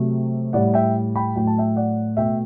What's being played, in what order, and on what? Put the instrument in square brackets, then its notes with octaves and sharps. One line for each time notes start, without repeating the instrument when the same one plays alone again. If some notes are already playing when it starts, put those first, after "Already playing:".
Already playing: [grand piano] C3 F#3 A3
A2 G3 D5 F#5
E5 G5
G5 B5
A2 F#3 A3 G5
A5
E5 G5
D5 F#5
B2 A3 E5 G5